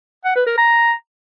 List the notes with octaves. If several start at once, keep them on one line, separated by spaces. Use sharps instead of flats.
F#5
B4
A#4
A#5